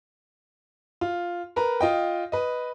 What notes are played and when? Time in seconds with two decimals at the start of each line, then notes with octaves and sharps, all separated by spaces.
1.01 F4
1.56 A#4 B4 A#5
1.81 F4 D#5 G5
2.32 B4 D#5